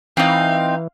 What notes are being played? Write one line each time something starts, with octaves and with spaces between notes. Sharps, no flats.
E3 C4 D#4 F5